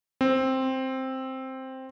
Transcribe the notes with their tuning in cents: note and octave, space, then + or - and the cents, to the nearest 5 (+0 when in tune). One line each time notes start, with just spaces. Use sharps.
C4 +5